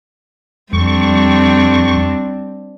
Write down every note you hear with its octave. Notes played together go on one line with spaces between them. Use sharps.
F2 G3 C4 D4 C#6